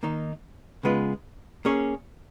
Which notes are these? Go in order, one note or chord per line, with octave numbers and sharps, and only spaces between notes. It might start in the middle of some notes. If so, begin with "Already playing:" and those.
D#3 A#3 D#4
C#3 G#3 B3 F4 B4
A#3 C#4 G#4 C#5